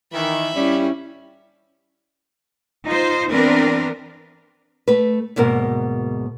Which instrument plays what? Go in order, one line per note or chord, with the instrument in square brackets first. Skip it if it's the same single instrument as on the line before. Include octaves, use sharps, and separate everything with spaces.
[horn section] D#3 E3 [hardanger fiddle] E5 B5
[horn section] G2 G3 [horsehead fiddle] C#4 E4
[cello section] D#4 F4 C5
E3 B3 C4 D4 A#4 B4
[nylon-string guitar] A3 B4
D2 G#2 B2 A#3 A#4